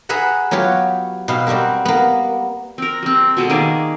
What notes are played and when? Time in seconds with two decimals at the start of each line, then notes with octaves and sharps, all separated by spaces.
0.09 G#4 B4 E5 F#5 A#5
0.51 F#3 B3 F4 G4 C#5
1.28 B2 B3 C4 F5
1.47 G3 C4 F#4 G4 A#4
1.85 A#3 B3
2.78 C4 A#4
3.02 G3 C4
3.37 B2 G#3 A4
3.50 D#3 A#3 G#4 D5